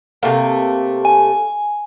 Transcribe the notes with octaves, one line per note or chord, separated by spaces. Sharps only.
C3 A3 A#3
G#5